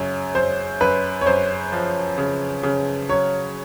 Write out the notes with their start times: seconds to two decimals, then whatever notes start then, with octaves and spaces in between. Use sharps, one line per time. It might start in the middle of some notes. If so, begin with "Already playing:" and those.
Already playing: F#2 C#3 C#5
0.35 F#2 C5
0.81 F#2 B4
1.21 C#5
1.26 F#2 C5
1.72 F3
2.18 C#3
2.63 C#3
3.09 F#3 C#5